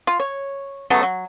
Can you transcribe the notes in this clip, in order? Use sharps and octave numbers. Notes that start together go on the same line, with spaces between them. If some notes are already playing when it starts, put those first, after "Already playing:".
F4
C#5
C#3 F#3 A3 B3
F#3